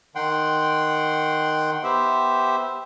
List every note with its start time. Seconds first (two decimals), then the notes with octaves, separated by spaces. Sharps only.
0.15 D#3 F#5 G5 C6
1.84 B3 G4 C5 E5